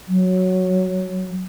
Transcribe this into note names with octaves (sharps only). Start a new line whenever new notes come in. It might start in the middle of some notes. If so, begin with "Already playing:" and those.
F#3